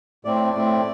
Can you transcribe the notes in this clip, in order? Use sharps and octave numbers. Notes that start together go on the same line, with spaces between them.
A2 A3 C4 D5
A2 A3 C4